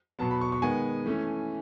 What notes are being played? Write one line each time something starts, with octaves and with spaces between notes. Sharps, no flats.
B2 F#3 B3 A5
B5
C#6
C#6
D#3 G#3 B3 G#5
E3 A3 C#4